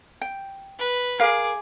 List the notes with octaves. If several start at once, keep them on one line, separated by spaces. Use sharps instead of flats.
G5
B4
G#4 A#4 F5 D6